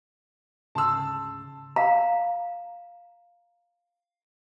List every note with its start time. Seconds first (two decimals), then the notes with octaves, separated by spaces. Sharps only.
0.75 D2 G#2 C#3 A5 C6 E6
1.76 F5 A#5